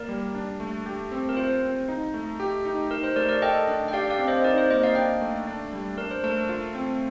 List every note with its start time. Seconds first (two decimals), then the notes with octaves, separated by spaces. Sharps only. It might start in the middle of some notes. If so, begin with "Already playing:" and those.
Already playing: A#3 A#4 D5
0.09 G3
0.35 D4
0.60 A3
0.86 G4
1.11 C4
1.29 A#4
1.37 F4 C5
1.63 C4
1.89 D#4
2.14 A3
2.40 G4
2.65 D#4
2.90 D#4 A#4
3.03 C5
3.16 A3 A#4 D5
3.29 A#4 D5
3.42 A4 D#5 G5
3.68 D4
3.88 G5
3.93 G4 D5 F5
4.10 D5 F5
4.19 C4
4.28 C5 D#5
4.44 D#4 A#4 D5
4.58 C5
4.70 A#3 C5 D#5
4.84 D5 F5
4.95 D4 D#5 G5
5.21 A3
5.47 D4
5.73 G3
5.98 D4 A#4
6.11 C5
6.24 A3 A#4
6.49 F4
6.75 C4